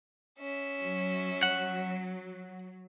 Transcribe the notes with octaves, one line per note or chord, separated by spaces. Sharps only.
C#4 E5
F#3
F#5